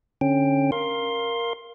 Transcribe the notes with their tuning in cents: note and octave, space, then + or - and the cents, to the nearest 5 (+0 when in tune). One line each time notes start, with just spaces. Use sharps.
D3 +0 C#4 -10 G5 +10
A#4 +0 F5 -5 C6 +15